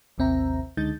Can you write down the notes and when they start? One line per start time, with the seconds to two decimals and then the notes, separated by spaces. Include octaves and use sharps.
0.18 A1 D#2 C3 C4 E5 A#5
0.77 C#2 D3 G#3 D#4 G6 A6